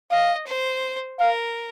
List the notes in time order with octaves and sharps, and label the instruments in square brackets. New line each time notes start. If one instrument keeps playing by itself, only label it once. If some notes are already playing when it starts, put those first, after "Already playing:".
[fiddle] D#5 [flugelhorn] F5
[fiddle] C5
[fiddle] A#4 [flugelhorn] F5